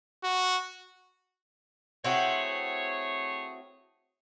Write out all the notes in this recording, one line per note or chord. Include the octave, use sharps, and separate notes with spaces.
F#4
A3 C4 E4 F#4 G#4 C#5